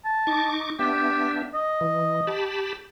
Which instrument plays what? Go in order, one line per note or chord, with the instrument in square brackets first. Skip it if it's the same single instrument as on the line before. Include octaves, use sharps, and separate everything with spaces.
[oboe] A5
[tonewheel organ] D#4 C#6 D6
[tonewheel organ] B3 D4 E5 [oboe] G4
[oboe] D#5
[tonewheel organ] E3
G4 A5 B5